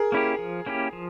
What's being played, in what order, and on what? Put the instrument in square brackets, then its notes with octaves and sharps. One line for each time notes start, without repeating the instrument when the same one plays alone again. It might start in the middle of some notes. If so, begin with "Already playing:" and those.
Already playing: [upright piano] G#4 A#4
[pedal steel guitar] A#3 C#4 E4 G4
F3
A#3 C#4 E4 G4
F3